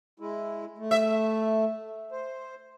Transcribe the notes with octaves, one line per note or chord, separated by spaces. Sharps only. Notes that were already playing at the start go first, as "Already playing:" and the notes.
G#3 E4
A3
E5
C5